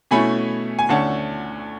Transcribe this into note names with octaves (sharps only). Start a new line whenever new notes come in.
B2 A3 C#4 E4 G#5 B5
G#5
D2 D3 A3 C#4 F#5 A5